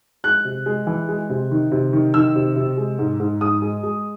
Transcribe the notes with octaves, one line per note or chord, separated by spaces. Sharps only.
G#3 F#6
C3
G#3
E3
G#3
C3
D#3
C3
D#3
D#3 E6
C3
C3
G#3
G#2
G#2
G#2 D#6
G#3
G#3